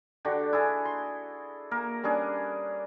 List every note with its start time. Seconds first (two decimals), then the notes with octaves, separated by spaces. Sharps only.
0.25 D3 D4 F#4 G4
0.53 E4 G#4 A4
0.85 C6
1.71 A#3 A#4
2.03 G3 C#4 D4 G#4